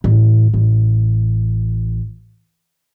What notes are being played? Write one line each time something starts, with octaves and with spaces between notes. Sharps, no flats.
A1
A1